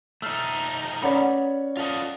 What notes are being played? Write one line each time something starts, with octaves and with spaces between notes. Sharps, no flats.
A3 D#4 E6 F6 C7
C#4 C#5 D5 F#5 B5
F4 A4 D#5